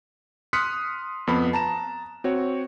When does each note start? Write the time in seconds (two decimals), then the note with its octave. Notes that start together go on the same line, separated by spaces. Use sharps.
0.53 C6 D#6 F6 F#6 B6 C#7
1.27 F2 B3 B5
1.53 A5 A#5 E7
2.24 C4 F#4 C#5